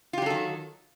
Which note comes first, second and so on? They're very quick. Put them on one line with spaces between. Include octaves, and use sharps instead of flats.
F4 G4 F#3 A4 D#3